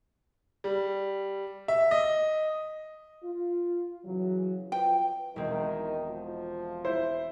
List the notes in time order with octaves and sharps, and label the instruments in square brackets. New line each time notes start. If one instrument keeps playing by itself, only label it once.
[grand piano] G3
E5
D#5
[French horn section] F4
C#3 E3 F#3
[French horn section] F3 B4 [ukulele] G5
[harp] E1 G#3 C4 [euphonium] D#3
[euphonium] F3
[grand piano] E4 C5